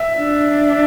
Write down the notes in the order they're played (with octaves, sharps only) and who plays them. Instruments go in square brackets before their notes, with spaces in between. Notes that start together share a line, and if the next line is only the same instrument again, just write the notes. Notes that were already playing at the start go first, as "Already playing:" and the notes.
Already playing: [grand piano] E5
[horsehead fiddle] D4